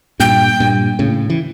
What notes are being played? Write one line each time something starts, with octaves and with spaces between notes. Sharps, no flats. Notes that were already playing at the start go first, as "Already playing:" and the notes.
G2 A#2 G5
G2 A#2
A2 C#3
E3